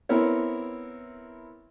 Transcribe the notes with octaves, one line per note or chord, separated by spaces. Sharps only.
B3 C4 E4 A#4 C#5